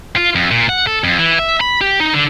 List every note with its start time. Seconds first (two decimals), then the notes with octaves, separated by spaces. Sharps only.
0.16 F4
0.35 F2
0.51 A#2
0.69 F#5
0.87 A4
1.04 F2
1.19 E3
1.39 E5
1.61 B5
1.81 G4
2.00 D#4
2.13 D3